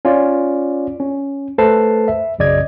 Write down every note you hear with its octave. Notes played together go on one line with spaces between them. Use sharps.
C#4 F4 D5
C#4
A3 A4 B4 C5 A5 C7
E5
B1 F#2 C#3 D5 D#5 G#6